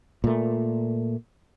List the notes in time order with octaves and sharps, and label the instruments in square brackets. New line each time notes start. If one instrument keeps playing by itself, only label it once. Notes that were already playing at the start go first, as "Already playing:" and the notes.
[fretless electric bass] A#2 A3